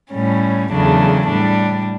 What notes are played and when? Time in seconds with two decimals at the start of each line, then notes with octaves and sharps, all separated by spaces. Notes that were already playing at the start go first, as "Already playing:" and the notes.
0.14 A2 G3 C#4
0.71 E2 C#3 F#3 A3 D4
1.28 A2 G3 D4